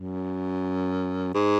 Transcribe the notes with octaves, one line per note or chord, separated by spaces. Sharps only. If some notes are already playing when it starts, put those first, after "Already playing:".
Already playing: F#2
G#2